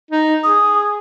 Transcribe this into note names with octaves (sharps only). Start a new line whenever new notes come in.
D#4
G#4 D#6